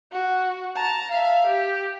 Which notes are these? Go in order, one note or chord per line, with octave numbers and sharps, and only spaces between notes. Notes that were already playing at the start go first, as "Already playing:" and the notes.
F#4
A5 A#5
E5 F5
G4